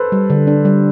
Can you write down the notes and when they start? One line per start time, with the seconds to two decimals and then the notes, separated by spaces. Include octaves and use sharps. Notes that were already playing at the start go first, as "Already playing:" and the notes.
Already playing: A4 B4 C5
0.12 G3
0.30 D3
0.47 D4
0.65 G3